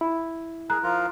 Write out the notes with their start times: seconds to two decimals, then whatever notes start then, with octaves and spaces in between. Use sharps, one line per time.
0.01 E4
0.70 G#4 A#4 A#5 F#6
0.83 F3 F4 A#4